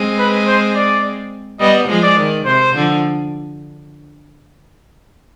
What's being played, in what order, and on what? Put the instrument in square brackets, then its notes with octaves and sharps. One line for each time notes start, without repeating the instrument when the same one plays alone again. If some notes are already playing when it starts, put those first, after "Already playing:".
Already playing: [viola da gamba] G#3 C4
[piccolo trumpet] B4
C5
D5
[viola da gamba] G3 B3 [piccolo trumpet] D#5
[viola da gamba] F3 G#3
[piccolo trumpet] D5
[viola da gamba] D#3
[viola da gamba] C3 [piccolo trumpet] C5
[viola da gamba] D3 F3